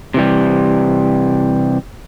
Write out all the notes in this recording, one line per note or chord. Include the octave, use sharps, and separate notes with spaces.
C3 E3 G3